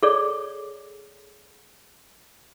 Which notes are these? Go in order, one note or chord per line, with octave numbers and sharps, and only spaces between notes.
G#4 A4 C#5 D5